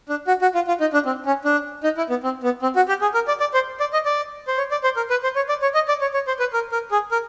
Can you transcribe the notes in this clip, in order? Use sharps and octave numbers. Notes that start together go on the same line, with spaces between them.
D4
F#4
F#4
F4
F4
D#4
D4
C4
C#4
D4
D#4
E4
B3
C4
B3
C4
F#4
G4
G#4
A#4
D5
D5
C5
D5
D#5
D5
C5
C#5
D5
C5
A#4
B4
C5
C#5
D5
C#5
D#5
D5
C#5
C#5
C5
B4
A#4
A#4
G#4
A#4